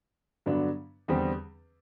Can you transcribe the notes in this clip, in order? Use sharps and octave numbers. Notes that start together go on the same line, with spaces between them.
G2 D3 F#3 B3 D4
E2 D3 G3 C4